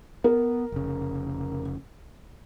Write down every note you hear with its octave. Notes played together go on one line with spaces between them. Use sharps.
B3 A#4
F1 C#3